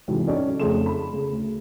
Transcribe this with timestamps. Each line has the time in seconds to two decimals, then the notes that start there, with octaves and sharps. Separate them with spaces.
0.08 G#2 C3 D#3 E3 F#3
0.27 C#4 D#4 A4 C#5 D5
0.60 F2 C#3 A3 G#4 C6 E7
0.86 B5
1.14 C#3
1.31 D2